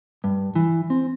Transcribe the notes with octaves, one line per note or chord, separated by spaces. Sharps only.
G2
E3
C4